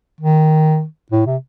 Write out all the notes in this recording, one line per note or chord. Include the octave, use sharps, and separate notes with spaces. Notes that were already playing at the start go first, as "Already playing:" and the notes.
D#3
A2
C3